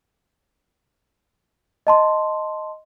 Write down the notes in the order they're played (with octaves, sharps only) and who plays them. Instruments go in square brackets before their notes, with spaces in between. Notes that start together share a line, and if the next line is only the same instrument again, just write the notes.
[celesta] D#5 A5 C6